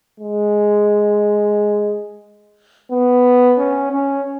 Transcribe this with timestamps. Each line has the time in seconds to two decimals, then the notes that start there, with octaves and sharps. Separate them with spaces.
0.20 G#3
2.91 B3
3.58 C#4
3.92 C#4